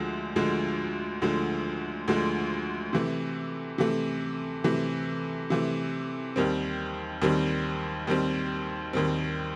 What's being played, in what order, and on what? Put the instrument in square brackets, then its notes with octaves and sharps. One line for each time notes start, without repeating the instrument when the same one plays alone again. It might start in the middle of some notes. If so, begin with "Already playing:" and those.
Already playing: [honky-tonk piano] D2 D3 F3 G#3
D2 D3 F3 G#3
D2 D3 F3 G#3
D2 D3 F3 G#3
C3 E3 A3
C3 E3 A3
C3 E3 A3
C3 E3 A3
D#2 D#3 G3 C4
D#2 D#3 G3 C4
D#2 D#3 G3 C4
D#2 D#3 G3 C4